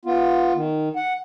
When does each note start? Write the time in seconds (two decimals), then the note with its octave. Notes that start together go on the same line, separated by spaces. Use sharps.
0.05 B3 F4
0.55 D#3
0.96 F#5